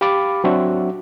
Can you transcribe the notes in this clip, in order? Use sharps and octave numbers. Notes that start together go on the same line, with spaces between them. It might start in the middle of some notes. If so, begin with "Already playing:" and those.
G4 F5 B5 D6 A6
F#3 C4 D4 F#4 E5 F#5